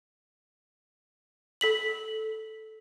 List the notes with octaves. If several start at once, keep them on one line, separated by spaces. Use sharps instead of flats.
A4 B6 F#7